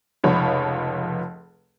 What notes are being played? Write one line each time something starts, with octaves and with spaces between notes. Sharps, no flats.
F1 C#2 F3 C#5 B5